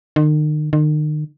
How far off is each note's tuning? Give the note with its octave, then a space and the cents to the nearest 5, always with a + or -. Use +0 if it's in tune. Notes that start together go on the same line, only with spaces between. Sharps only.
D#3 -40
D#3 -40